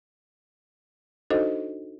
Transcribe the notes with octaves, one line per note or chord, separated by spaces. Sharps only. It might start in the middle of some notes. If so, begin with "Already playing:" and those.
D4 D#4 F#4 A4 C5 D#5